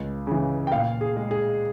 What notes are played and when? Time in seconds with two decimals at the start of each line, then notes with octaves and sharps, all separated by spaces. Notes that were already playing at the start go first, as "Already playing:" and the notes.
Already playing: C#2
0.27 C#3 E3
0.67 G5
0.71 A#2 F5
1.01 G#4
1.16 G#3
1.31 G#4